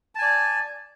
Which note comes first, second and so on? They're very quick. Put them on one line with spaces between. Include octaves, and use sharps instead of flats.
A5 G#5 D5